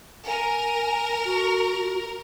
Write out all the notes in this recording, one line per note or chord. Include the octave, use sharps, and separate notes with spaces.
A#4 G#5
F#4